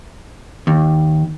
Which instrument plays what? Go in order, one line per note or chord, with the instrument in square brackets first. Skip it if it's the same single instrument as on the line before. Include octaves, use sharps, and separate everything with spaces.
[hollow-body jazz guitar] D#2